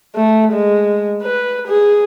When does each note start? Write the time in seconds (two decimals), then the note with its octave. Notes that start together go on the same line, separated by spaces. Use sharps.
0.16 A3
0.52 G#3
1.23 B4
1.68 G#4